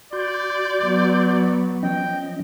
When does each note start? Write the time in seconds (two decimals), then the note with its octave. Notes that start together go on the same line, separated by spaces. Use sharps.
0.13 F#4 D5 C6 G6
0.82 F#3 B3
1.83 F3 C#4 D#5 G5